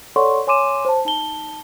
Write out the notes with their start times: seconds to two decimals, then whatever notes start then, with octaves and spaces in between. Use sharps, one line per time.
0.16 A4 C#5 D5 F#5 C6 C#6
0.47 C#5 G#5 C6 D6 D#7 E7
0.85 C5 A5
1.05 D#4 A5 G7